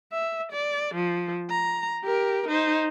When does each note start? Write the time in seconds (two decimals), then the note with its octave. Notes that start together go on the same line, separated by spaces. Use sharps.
0.13 E5
0.52 D5
0.95 F3
1.50 A#5
2.04 G4 A#4
2.48 D#4 C5